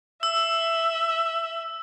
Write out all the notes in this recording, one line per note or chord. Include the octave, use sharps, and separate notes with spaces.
E5 E6